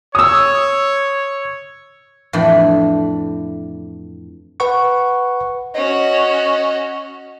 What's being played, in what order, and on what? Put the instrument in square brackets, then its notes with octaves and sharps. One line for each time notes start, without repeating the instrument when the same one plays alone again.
[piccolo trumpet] C#5 [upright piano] D#6 E6
[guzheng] F2 A2 E3 D4 E4 G5
[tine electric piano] B4 F#5 C#6
[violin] C#4 F#4 [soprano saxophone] D#5